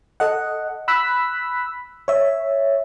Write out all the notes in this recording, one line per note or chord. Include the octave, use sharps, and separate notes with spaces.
A4 D#5 F#5
B5 E6 F#6 B6
C#5 E5